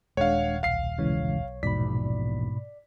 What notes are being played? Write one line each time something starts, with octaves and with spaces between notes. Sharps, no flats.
D#1 G#3 D4 C#5 F5 F#5
B1 F5 C7
B1 C#3 E3 G#3 C#5
A#1 E2 G#2 B2 D5 B5 B6